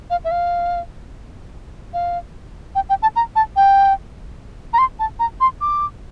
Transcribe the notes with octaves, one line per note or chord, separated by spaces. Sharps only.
F5
E5
F5
F5
G5
G5
A5
A#5
A5
G5
A#5
C6
A5
A#5
C6
D6